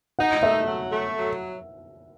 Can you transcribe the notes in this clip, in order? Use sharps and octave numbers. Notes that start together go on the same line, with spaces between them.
D#4 F#5
A3 E5
F#3
A3
F#3